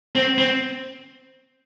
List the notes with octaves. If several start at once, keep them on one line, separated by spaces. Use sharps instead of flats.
C4
C4